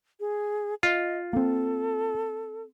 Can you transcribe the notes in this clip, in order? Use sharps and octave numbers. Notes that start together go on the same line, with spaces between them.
G#4
F4 D#5
A#3 C4 A4